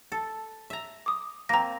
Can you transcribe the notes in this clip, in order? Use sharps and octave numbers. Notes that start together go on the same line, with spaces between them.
A4
E5 A#5
D6 D#6
A#3 C4 A#5 A#6